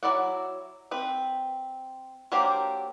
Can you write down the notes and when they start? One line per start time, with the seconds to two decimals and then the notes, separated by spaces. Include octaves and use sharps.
0.03 F#3 E4 D5 F#5
0.91 C4 B4
2.32 F#3 A#3 D4 G4 C5